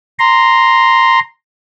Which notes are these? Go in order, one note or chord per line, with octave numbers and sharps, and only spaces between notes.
A#5 C6